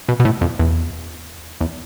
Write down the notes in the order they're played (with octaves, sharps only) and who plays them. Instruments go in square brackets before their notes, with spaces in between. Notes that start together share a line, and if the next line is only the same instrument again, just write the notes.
[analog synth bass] B2
B2
A2
F2
E2
E2